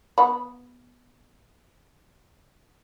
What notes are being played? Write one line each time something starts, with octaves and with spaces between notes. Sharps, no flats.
B3 F#5 B5